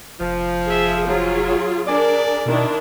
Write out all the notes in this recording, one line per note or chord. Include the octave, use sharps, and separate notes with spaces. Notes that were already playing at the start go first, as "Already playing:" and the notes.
F1 F3
G#4 E5
F#3 F4 G#4
D4 G#4 A#4 D5
B2 D#3 D4 E4